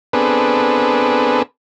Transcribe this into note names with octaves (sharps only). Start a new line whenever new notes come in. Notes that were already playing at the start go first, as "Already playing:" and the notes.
B3 C4 D4 G#4 A4 B4